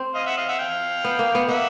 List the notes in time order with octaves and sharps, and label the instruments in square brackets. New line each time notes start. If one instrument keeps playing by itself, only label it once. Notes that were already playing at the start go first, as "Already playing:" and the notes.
Already playing: [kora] C4
[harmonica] D#5 F5
E5 F#5
D#5 F5
E5 F#5
F5 G5
[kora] B3
A#3
B3
[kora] A#3 [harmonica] E5 F#5